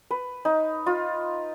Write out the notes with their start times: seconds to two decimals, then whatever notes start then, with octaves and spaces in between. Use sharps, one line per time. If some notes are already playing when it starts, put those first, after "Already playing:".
0.11 B4
0.45 D#4
0.86 F4